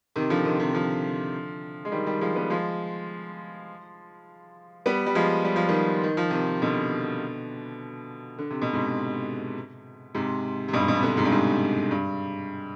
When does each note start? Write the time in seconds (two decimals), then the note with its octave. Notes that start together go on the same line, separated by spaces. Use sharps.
0.16 C3 D#3
0.30 D3 F3
0.45 C3 D#3
0.59 C3 D#3
0.74 D3 F3
1.85 G#3
1.92 D#3 G3
2.07 D#3 G3
2.21 F3 G#3
2.36 G3 B3
2.50 F3 G#3
4.86 G3 B3
5.06 G3
5.15 F3 G#3
5.45 G3
5.56 F3
5.69 D#3 G3
6.03 D#3
6.17 F3
6.30 C3 D#3
6.62 B2 D3
8.38 D3
8.50 C3
8.62 B2
8.73 G#2 C3
10.15 G#2 C3
10.68 C3
10.73 G2 B2
10.81 G#2
10.88 B2
10.95 C3
11.02 B2 D3
11.17 G#2 C3
11.25 G2
11.32 G#2
11.91 G2